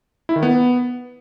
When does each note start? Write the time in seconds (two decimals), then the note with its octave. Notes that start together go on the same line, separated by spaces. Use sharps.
0.29 E4
0.36 D#3
0.43 B3